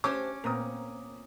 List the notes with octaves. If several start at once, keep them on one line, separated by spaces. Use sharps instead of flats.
C#4 D4 G4 C5 D6
A#2 B3 C4 A#4 A#5 D#6